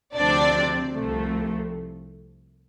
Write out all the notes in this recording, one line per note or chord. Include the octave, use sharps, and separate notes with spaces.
D2 C3 F3 C4 D4 D5
C2 C3 F3 A3